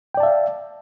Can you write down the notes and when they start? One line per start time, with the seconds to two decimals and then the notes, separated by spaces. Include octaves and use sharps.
0.14 G5
0.17 D5
0.20 A5
0.23 E5
0.26 F5